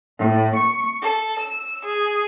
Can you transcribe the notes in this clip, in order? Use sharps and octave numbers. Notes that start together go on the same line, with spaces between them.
A2
C#6
A4
E6
G#4